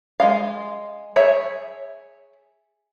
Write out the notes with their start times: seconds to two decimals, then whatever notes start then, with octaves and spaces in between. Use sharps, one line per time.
0.20 G#3 D#5 F5
1.16 G#4 C#5 E5